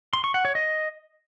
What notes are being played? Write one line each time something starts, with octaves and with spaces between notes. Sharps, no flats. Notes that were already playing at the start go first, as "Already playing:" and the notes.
C6
C#6
F#5
C#5
D#5